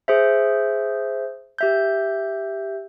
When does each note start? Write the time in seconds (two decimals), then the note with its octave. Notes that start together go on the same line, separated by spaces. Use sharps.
0.08 G#4 C5 E5
1.58 G4 E5 G6